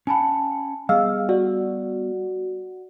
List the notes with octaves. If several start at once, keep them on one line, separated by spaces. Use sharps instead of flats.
C#4 F#5 G#5 A5 B5
G3 B3 G#4 D#5 F5 E6
F#4 D5